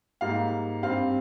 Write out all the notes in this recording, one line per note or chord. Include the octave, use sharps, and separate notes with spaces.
G#2 G3 A#3 F5
G2 G3 C4 F5